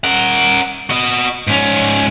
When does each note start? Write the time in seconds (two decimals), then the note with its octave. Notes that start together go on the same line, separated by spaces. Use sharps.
0.04 A#4 F#5
0.90 F#4 D#5
1.47 G#2 C#4